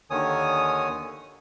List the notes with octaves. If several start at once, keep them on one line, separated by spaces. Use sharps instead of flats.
D#2 D3 D#3 C#5 G#5 D#6